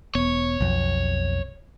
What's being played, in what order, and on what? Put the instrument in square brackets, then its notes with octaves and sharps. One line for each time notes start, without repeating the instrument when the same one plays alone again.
[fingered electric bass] E1 B3 [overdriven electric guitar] C#5
[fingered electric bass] B1 F2